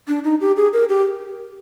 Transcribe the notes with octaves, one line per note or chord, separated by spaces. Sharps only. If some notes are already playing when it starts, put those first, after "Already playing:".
D4
D#4
G4
G#4
A#4
G4